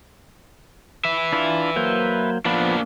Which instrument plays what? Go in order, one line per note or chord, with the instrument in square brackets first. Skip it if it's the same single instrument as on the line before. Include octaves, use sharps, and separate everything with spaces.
[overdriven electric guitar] B4 E5
[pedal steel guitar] D4 E4 F4
F#3 A#3 C5
[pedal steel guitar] F3 B3 B5 [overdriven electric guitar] A#3 D4